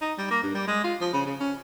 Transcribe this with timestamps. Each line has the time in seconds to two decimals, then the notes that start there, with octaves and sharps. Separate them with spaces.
0.01 D#4
0.18 G3
0.31 A#3
0.43 G2
0.55 G3
0.68 G#3
0.84 F4
1.01 F3
1.13 C#3
1.26 C#3
1.40 C#4